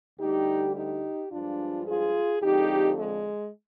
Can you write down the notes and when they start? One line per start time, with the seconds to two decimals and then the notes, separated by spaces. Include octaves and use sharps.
0.20 D2 D3 G3 D#4 G4
0.76 D#4 G4
1.32 G2 F3 G#3 D4 F4
1.87 F4 G#4
2.43 F2 D3 G#3 D#4 G4
2.99 G#3